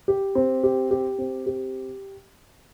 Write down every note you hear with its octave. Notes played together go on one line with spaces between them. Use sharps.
G4
C4
G4
G4
C4
G4